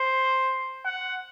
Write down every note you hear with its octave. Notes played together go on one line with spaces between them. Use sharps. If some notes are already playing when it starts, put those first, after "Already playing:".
Already playing: C5
F#5